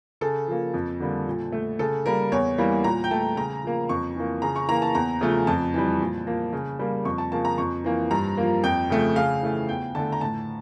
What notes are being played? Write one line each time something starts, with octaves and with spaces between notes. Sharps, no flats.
C#3 A4
F3 A#3
F2
D3 G3 A#3
A#2
A3
C#3 A4
G3 A#3 A#4
E2 C#5
E3 G3 A#3
A#2 A#5
G5
A3 A5
C#3 A#5
F3 A#3
F2 C#6
E3 A#3
C#3 A#5
C#6
E3 A#3 A#5
A5
E2 A#5
C#3 F3 A3
F2 A5
E3 G3
A#2
F3 A#3
C#3
G3 A#3
F2 C#6
A5
C#3 F3 A#3 A5
A#5
F2 C#6
E3 A#3
G2 A#5
F3 A#3
F2 G5
C#3 F3 A3
C#3 F5
E3 A3
E2 G5
D3 A3 A5
A#5
A2 A5